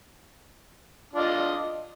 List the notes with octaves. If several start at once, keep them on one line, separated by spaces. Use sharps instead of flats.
D4 F4 D#5